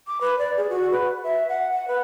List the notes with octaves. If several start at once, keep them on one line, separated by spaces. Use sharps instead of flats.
D6
B4
D5
G#4
F#4
B4
E5
F#5
F#5
B4